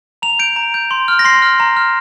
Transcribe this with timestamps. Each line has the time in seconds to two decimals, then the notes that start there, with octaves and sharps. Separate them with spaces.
0.22 A#5 F7
0.39 G6 D7
0.56 A#5
0.74 G6
0.91 C6
1.08 F6
1.19 A#6
1.25 C6 C7
1.42 F6
1.60 A#5
1.77 F6